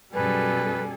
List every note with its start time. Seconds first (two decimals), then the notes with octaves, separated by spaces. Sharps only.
0.14 F#2 B2 G3 G#4 A4 B4